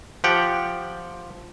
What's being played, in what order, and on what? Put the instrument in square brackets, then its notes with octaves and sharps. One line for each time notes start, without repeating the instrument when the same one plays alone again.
[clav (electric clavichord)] F3 G4 F#5 G5